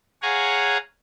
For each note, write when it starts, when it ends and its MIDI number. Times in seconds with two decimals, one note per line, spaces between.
0.22 0.77 68
0.22 0.77 73
0.22 0.77 77
0.22 0.77 78
0.22 0.77 80
0.22 0.77 82